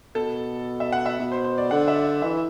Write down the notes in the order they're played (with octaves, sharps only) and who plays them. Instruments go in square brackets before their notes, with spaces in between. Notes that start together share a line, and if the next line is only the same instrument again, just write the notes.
[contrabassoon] B2 [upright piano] A4
[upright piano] E5
F#5
E5
[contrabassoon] B2
[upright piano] C5
C5
D5
[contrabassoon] D3 [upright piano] F#5
[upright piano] E5
D5
[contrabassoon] E3 [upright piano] E5